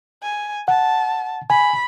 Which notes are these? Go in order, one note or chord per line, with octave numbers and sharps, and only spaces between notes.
G#5
F#5 A5
G#5 B5